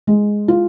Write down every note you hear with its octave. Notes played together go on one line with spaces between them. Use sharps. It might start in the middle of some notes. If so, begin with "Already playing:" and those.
G#3
F4